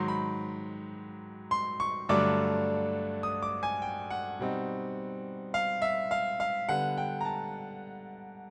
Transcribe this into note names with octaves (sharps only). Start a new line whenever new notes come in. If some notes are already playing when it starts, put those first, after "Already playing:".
Already playing: G#2 D#3 F#3 C6
B5
C6
C#6
G2 D3 F#3 A3 D4 D6
D#6
D6
G#5
G5
F#5
B2 G3 C4 D#4
F5
E5
F5
F5
D3 G3 B3 F#5
G5
A#5
A5